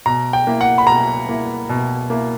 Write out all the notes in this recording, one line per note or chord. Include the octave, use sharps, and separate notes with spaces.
B2 A#5
G5
A#3 E4
F#5
B5
B2 A#5
A#3 E4
B2
A#3 E4